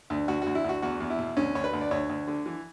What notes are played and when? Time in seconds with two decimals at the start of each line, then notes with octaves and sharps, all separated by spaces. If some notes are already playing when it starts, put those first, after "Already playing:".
0.10 D2
0.28 D2 F#4
0.42 D2 F#4
0.55 E4
0.64 D2 F#4
0.82 E2 F#4
1.00 E2
1.10 E4
1.19 B2
1.37 D2 C#4
1.55 D2 C#5
1.64 B4
1.73 D2
1.81 D5
1.91 D2 C#5
2.10 D2
2.28 D3
2.46 E3